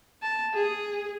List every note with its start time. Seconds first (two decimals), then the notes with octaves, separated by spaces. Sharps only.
0.22 A5
0.54 G#4